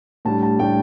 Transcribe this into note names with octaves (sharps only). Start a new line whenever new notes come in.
A2 G3 D4 A5
A5
A2 G3 D4 G5